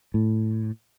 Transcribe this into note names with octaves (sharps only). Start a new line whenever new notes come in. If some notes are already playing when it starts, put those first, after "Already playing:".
A2